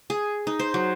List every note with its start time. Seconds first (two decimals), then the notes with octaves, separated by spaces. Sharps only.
0.10 G#4
0.47 D#4
0.59 C5
0.74 F#3